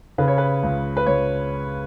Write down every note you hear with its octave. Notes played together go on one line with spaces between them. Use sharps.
C#3 B4
C#5
B4
C#2
B4
C#2 C#5